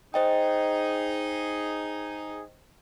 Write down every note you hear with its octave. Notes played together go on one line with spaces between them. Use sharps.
D#4 G#4 C5 D#5 G5